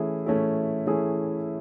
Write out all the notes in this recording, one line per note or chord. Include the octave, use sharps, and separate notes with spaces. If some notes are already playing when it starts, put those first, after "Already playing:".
Already playing: E3 A3 C#4 E4 G#4
E3 A3 C#4 E4 G#4
E3 A3 C#4 E4 G#4